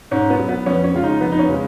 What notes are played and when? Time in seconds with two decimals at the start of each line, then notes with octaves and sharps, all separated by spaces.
0.11 G#2 C#4
0.30 B3
0.39 F#3
0.49 B3
0.66 F2 C#4
0.84 C#4
0.94 C#3 G#3 F4
1.03 D#4
1.21 F2 B3
1.32 D#4
1.39 C#4
1.49 C#3 G#3